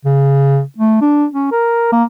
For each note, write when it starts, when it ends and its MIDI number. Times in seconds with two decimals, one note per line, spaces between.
0.05 0.61 49
0.78 0.97 57
1.01 1.26 62
1.33 1.50 61
1.51 1.89 70
1.92 2.04 58